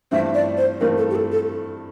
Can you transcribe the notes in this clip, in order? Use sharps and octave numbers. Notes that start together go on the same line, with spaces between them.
G2 E3 A3 C4 F4 E5
D5
C5
G2 E3 A3 C4 F4 A#4
A4
G4
A4
A4